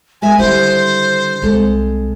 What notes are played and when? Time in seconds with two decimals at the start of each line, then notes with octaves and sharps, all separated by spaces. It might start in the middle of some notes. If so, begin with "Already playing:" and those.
0.22 G#3 A#4 E5 G#5
0.38 D3 D#3 G3 E4 C5
1.42 C2 G#3 A4